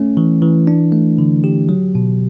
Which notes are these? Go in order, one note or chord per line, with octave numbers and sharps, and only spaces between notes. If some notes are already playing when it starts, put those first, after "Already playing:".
Already playing: A3 C#4
E3
E3
D4
A3
D3
G4
F#3
B2